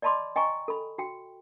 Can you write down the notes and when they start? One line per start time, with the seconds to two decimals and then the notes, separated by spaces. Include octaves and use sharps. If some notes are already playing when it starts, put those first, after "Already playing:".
0.02 D5 D#5 A5 B5 C6 D6
0.36 D#5 G5 G#5 A#5 C#6
0.68 A4 B5
0.98 F#4 G5